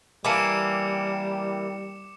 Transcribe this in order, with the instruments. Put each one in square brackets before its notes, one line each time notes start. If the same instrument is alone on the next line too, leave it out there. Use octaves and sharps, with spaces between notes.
[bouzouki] E3 A#3 [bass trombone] G3 [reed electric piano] G#5 A5 [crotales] D6 C#7 E7